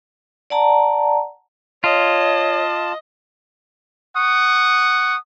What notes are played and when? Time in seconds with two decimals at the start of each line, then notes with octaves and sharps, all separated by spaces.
0.50 D5 F#5 A5 A#5
1.84 F4 C#5 D#5 A5
4.17 F#5 C#6 D#6